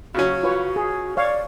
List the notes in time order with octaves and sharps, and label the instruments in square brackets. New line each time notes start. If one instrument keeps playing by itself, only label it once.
[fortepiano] C#3 F#3 C#4 [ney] F#4
[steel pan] F4 B4 C#5
G#4
[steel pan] C#5 F5 [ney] D5